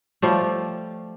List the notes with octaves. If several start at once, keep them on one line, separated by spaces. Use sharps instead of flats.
F3 G3 A3